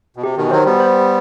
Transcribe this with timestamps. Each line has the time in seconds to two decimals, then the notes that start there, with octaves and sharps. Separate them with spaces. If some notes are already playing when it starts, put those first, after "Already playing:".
0.16 B2
0.23 C3 G4
0.37 B2 D#3
0.44 E3
0.51 D#3 F#3 C5
0.65 G3 B3
0.80 C5